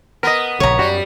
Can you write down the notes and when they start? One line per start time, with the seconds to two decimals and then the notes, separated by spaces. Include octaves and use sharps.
0.23 B3 A#4 D#5
0.60 A#1 C#3 C#5 A#5
0.79 F#2 G3 F#4